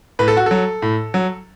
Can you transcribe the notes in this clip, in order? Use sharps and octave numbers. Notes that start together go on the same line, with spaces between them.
A2 B4
A4
F#4
F#3 A4
A2
F#3